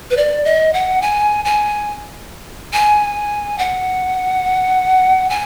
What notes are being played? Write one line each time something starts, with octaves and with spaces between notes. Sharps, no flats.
B4
D5
D#5
F#5
G#5
G#5
G#5
F#5
G#5